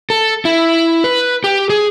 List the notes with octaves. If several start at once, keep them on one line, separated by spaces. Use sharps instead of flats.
A4
E4
B4
G4
G#4